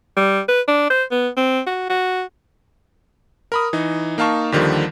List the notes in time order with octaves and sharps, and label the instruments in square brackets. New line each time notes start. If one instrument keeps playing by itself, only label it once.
[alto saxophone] G3
B4
D4
C5
B3
C4
F#4
F#4
[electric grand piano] A#4 B5 D#6
E3 D#4
A#3 D#4 F5 A5 C#6
D#2 D3 D#3 F3 G3